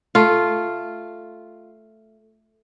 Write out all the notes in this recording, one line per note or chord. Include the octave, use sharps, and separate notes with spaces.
A3 F4